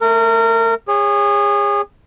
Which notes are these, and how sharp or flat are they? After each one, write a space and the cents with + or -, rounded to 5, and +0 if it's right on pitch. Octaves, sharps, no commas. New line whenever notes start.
A3 +0 A#4 -30
G#4 -30 C#5 +0